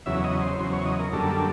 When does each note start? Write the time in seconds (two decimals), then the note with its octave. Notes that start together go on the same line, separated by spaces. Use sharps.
0.06 E2 C#3 F#3 E5
0.24 D#5
0.42 C5
0.59 E2 C#3 F#3 C5
0.73 C#5
0.86 D#5
0.99 A#4
1.12 F#2 D3 G3 A#3 A4